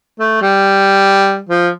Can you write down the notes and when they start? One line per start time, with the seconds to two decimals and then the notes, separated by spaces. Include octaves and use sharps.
0.19 A3
0.42 G3
1.49 F3